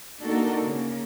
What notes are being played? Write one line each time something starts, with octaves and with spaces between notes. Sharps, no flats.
A#3 D4 D#4 F#4 A4 A#4
C#3 A#3